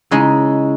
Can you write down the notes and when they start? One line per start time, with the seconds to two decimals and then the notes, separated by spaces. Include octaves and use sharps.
0.11 C#3 G#3 D#4 E4